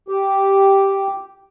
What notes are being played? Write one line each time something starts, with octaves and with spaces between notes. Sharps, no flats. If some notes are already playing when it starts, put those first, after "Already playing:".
G4